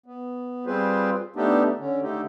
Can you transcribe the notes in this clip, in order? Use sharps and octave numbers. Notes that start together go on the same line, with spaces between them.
B3
G3 C4 F4 G#4 B4 C5
A3 B3 D4 D#4 G4
D3 C#4
D3 A3 D#4 G4